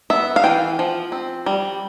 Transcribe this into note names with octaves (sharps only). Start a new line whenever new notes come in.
B3 E5
F5
E3 G5
F3
C4
G3